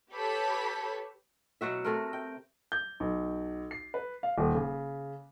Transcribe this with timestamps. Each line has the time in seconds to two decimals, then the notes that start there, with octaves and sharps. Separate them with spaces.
0.13 G4 A4 B4 C#5 B5
1.61 B2 F#3 F#4 E5
1.84 C3 A3 A#4
2.13 G5
2.72 G6
3.00 B1
3.71 C7
3.94 B4
4.23 F5
4.38 D#1
4.55 C#3